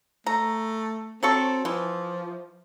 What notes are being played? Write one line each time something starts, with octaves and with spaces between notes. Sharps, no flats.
A3 A#5
F#3 C4 A4 C#6
E3 F3